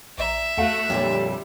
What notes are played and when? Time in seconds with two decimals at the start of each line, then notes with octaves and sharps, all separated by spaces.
0.18 A#1 D5 E5 A#5
0.57 E2 A3 F#4 F5 F#5
0.90 F2 A#2 D3 F#3 G3